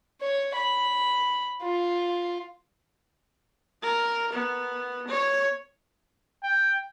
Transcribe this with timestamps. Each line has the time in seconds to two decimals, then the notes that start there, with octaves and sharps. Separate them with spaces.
0.21 C#5
0.55 B5
1.62 F4
3.82 A#4
4.33 B3
5.08 C#5
6.43 G5